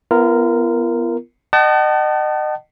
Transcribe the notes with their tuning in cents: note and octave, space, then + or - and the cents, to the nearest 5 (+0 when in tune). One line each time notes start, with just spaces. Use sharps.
B3 +0 F4 -45 A#4 +0
D#5 -30 F#5 +45 A5 +0